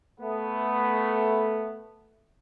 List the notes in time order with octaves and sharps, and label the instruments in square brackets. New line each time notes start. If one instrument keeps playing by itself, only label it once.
[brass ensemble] A3 B3